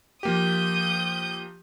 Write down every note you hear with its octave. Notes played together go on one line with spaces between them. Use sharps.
F3 A#3 G4 D#6 G6